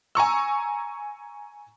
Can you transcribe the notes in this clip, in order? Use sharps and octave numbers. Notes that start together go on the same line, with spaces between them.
G#5 A#5 C#6 E6